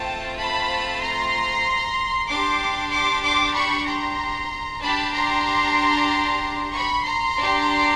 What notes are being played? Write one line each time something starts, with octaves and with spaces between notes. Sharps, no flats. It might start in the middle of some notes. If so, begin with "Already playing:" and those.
Already playing: A3 C4 F4 G5 A5
A5 B5
A#5 C6
D4 G4 C6 D6
C6 D6
C6 D6
B5 C#6
A#5 C6
D4 G4 A5 B5
A#5 C6
B5 C#6
A#5 C6
D4 G4